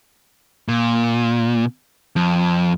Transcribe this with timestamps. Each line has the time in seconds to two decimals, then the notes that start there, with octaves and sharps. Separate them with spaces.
0.68 A#2
2.16 F2